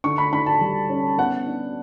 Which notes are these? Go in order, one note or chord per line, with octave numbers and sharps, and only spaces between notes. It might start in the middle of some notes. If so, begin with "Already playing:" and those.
D3 C#6
B5
D3 B5
A5
G3
C#4
B3 F#5
D4